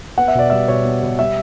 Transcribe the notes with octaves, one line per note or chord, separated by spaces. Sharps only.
B3 F#5
E5
B2 D5
G3 E5
B2 C#5
B3
B2
G3 E5